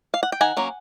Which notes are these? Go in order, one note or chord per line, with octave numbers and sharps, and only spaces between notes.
F5
F#5
G5
D#3 F#5 G#5
F#3 A#3 C#4